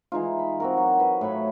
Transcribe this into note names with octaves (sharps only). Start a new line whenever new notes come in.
E3 G#3 D#4 F4
B5
C4 F#4 A#4
F#3
B4
A2 B4 C#5 B5